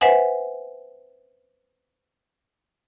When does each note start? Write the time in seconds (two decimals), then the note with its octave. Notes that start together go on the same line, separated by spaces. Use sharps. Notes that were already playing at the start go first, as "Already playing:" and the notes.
0.01 B4 C5 E5 F#5 G#5